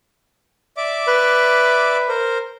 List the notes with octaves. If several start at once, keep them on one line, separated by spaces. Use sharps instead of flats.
D5 E5 D6
B4
A#4 C5